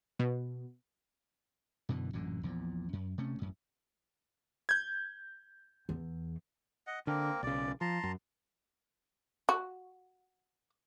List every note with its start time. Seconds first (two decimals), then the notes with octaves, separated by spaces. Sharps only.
0.19 B2
1.89 F#2 B2 D3 E3
2.13 A1 F#2 A#2 D3
2.43 A#1 E2 A#2
2.93 F#2
3.18 C3 A3 C#4
3.39 A1 F#2
4.69 G6 G#6
5.89 E2
6.87 D#5 F#5
7.07 D3 A#3 C4 A#4
7.43 B1 C#3 D5
7.81 F3 A5 A#5 C6
8.04 F#2
9.49 F#4